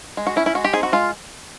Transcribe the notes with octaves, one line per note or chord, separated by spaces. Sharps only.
G#3
F#4
C#4 E4
E4
G#3 F#4
G4
C4 D#4 G#4
F#4
G#3 F4